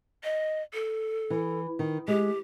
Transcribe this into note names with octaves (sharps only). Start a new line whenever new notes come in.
D#5
A4
E3
D#3
G#3 G4